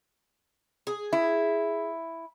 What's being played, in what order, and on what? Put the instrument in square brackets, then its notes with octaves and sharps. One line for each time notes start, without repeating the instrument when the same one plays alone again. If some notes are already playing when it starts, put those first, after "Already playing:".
[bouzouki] G#4
[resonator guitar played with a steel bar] E4